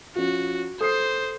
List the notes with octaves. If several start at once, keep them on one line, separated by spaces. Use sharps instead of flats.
F3 C#4 F#4
A4 C5 D#6 C7